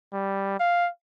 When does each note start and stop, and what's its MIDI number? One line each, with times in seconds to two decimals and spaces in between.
0.13 0.55 55
0.60 0.89 77